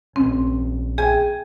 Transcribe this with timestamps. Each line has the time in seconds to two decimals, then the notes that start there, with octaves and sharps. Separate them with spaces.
0.16 A#1 C4 C#4
0.98 G#4 G5 G#5